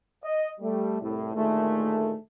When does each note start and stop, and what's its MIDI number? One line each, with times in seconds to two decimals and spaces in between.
0.24 0.50 75
0.60 1.01 55
0.60 1.01 57
1.02 1.35 36
1.02 1.35 45
1.35 2.15 38
1.35 2.15 46
1.35 2.15 51
1.35 2.15 56
1.35 2.15 57